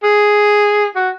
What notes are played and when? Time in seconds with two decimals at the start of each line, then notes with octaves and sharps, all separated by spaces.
0.03 G#4
0.96 F#4